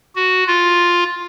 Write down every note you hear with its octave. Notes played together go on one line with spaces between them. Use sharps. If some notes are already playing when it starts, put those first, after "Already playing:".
F#4
F4